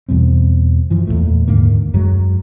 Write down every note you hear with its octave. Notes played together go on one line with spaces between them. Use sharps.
E2 B2 G3 C4
F#2 E3 F3
E2 G2 A#2 A3
D#2 G#2 D3 A#3
F#2 F#3 G#3